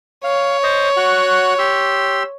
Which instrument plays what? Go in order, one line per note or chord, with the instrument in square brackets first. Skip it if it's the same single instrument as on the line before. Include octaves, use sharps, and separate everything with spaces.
[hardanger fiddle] C#5 [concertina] F5
[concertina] C5 D#5
F#4 F#5 F#6
G4 C6 E6